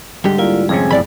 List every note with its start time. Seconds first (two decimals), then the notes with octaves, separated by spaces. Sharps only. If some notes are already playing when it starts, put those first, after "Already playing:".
0.24 G#2 D3 G3 G4
0.38 A#3 E4 F4 D5
0.69 F2 C3 C#4 G#4 G#5
0.91 F#1 A2 D5 B5